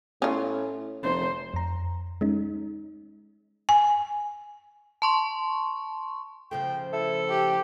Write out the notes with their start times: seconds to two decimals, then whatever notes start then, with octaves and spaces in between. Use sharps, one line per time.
0.22 A2 C#4 F4
1.03 F1 C5
1.54 F2 A#5
2.21 G#3 C#4 D#4
3.69 G#5
5.02 A5 C6 C#6
6.51 C#3 F3 A3 G5
6.93 E4 A4
7.30 G4